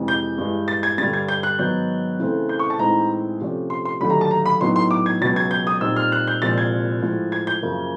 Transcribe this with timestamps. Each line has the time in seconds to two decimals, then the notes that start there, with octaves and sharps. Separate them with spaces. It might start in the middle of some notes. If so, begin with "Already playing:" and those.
Already playing: F2 C3 E3 G#3
0.08 G6
0.38 G2 E3 G#3
0.68 A6
0.83 G#6
0.98 G2 D3 G3 A6
1.13 G#6
1.28 G6
1.43 F#6
1.59 G#2 D#3 F#3 B3 G6
2.20 C#3 E3 A3 C4
2.49 G6
2.59 C#6
2.70 A5
2.79 A2 E3 G#3 C4 D#4 A#5
3.41 C3 F3 A3 C#4
3.70 C6
3.85 C6
4.01 D#2 D3 F#3 A3 B5
4.10 A#5
4.21 A5
4.31 A#5
4.46 B5
4.60 A2 F#3 B3 D#4 C6
4.76 C6
4.91 D6
5.06 G#6
5.21 C#2 B2 F#3 A6
5.36 G#6
5.51 G6
5.67 D#6
5.81 A#2 G3 C4 D#4 E6
5.96 F6
6.12 F#6
6.27 G6
6.42 C2 A#2 F3 G#3 C4 A6
6.58 G#6
7.02 A2 F3 G#3
7.32 G#6
7.47 G6
7.63 F#2 C#3 F3 A#3